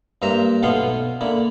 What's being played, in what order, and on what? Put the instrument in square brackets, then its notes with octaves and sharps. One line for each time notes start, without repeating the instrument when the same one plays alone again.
[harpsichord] G2 A#3 C5 E5 A#5
B1 B2 A3 B3 F5 C6
D3 A#3 E4